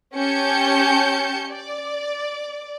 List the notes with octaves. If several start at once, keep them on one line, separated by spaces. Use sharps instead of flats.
C#4 G4 A5 G6 C#7
D5